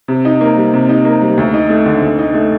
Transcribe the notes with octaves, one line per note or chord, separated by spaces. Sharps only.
C3
D#4
A#3
G3
C3
D#4
A#3
G3
D2
D#4
A3
D3
D2
D#4
A3